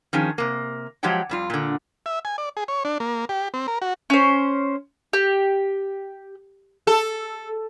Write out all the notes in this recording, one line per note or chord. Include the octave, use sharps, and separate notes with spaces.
D#3 F3 C#4 G#4
C3 A#3
F3 F#3 G#3 G4 F#5 G5
F2 G3 F4
A#2 D3
E5
G#5
D5
G#4
C#5
D4
A#3
G4
C4
A#4
F#4
C#4 C5
G4
A4